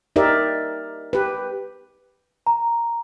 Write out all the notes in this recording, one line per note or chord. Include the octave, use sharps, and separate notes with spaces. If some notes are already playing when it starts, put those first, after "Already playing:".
D#4 G4 A#4 D5 E5
G4 B4
A#5